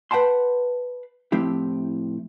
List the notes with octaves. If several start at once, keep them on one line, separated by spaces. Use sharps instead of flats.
B4 F#5 G5 A5 C6
A2 F3 C4 E4 G4